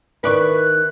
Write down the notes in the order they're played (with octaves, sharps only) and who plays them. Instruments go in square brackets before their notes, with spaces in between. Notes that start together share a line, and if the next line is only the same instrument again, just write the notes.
[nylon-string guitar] D#3 E4 [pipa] C#4 D5 C#6 [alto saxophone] B4 [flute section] F#6